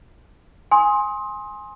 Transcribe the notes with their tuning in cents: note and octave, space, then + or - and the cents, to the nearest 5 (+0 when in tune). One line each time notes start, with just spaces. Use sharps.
G#5 +0 C6 +20 D#6 +25